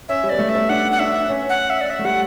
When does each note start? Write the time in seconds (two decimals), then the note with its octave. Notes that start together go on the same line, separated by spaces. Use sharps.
0.09 C#4 E5
0.24 G3
0.29 B3 D5
0.39 A3
0.49 E5
0.55 B3
0.69 D4 F#5
0.92 F#5
0.99 D4 E5
1.29 C#4
1.49 F#5
1.70 E5
1.81 D5
1.90 E5
1.99 A3
2.05 G3 F#5